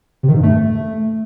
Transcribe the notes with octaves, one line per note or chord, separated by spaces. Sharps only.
C3
D#3
G#2
G2
A3